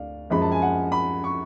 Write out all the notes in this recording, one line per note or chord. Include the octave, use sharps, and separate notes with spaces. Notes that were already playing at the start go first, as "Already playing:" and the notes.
Already playing: D2 D5 F5
F#2 F3 G#3 B5
A5
G#5
F#5
B5
C#6